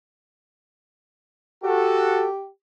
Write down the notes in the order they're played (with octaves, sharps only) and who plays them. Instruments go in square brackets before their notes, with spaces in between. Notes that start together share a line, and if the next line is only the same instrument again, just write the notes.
[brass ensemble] F#4 A4 [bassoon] G4